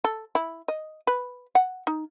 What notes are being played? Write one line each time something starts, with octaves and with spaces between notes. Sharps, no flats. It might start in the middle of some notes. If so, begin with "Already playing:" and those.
A4
E4
D#5
B4
F#5
D#4